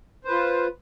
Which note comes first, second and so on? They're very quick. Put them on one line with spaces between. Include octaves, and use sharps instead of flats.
C5 B4 F4